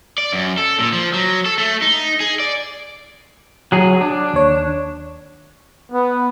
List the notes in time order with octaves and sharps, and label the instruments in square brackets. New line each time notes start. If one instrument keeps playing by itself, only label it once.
[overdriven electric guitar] D5
F#2
A4
A#2
F3
F#3
A4
A3
D#4
G#4
D5
[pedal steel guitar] F#3 G#4
D4
[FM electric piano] D#2 C#5
[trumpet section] B3